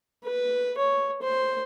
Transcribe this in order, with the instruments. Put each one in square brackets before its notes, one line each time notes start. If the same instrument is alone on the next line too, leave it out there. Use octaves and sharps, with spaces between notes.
[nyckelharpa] B4
C#5
C5